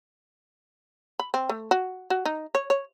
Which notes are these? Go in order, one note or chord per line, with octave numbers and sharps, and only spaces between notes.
B5
C4
A3
F#4
F#4
D#4
C#5
C#5